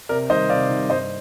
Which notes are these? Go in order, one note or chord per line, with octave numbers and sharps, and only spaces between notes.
C3 A#4 D5
D#3 G3 C5 D#5
C3 D5 F5
D#3 G3
G2 C5 D#5